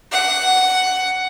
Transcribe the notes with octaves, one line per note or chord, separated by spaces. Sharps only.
F#5